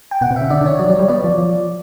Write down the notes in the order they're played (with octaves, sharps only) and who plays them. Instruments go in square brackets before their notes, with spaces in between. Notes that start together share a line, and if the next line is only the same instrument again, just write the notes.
[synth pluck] G5
[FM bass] B2 [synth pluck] F#5
[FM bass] C3
[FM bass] C#3 [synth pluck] E5
[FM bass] D3 [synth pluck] D5
[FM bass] D3
[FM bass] D#3 [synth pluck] C#5
[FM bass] F#3 [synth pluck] D5
[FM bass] F#3 [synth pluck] C#5
[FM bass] G3
[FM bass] B3 [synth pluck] D5
[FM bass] F3
F3